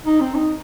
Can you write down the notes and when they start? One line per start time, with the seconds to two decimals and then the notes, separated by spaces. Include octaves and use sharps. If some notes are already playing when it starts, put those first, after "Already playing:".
0.06 D#4
0.20 C4
0.35 D#4